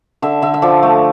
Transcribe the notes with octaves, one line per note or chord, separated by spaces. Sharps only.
D3 E5
D3 E5
E5
F3 D5
A3